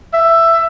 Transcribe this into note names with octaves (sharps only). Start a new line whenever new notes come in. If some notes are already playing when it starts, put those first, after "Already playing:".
E5